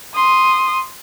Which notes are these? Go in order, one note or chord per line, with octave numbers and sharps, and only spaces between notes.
C6 D#6